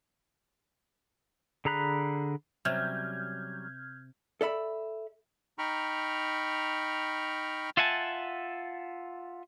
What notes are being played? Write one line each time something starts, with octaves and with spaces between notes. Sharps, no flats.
D3 G#4 A#5 B5 F#6
C3 F#3 G3 C#4 F6 G6 G#6
A4 D5 E5 B5
D#4 G5 A#5 B5 C#6 F6
F4 E5 F#5 G#5 A5